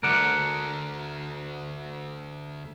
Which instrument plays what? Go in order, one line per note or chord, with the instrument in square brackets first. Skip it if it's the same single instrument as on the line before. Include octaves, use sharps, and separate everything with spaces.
[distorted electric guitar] D2 A3 [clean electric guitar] A#4 D5 F#5